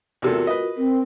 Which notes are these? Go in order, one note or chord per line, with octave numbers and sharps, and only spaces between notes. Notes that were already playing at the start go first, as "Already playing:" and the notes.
E2 C3 F4 F#4 A4 A#4
B4 D#5
C4 A#4